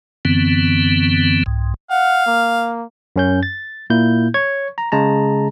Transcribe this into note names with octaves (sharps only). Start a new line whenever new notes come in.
F#2 D3 E3 B3 C4
C2 G#2
F5 F#5
A#3
F#2 C#4 G6
A6
A#2 A#3 E4 G6
C#5 C#6 G#6
A#5
C#3 G#3 A5 A#5